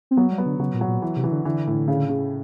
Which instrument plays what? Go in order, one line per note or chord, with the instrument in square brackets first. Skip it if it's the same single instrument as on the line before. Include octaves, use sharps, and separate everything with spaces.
[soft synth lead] C4
[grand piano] F#3 [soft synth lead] B3
[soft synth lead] G3
[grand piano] B3
[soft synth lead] D3
[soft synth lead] C#3 [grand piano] F#3
[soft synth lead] A#2
[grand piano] F#3
[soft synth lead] A#2
[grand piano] E3
[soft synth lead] C3
[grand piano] E3
[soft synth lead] D3
[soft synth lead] D3 [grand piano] E3
[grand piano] A2
C#3
C#3